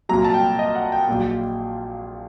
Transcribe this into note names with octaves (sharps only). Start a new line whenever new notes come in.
C2 A#2 F#3 A#5
A5
G5
D#5
F#5
G5
A#1 A#2 F#3